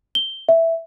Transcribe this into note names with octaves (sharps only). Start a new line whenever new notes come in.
G7
E5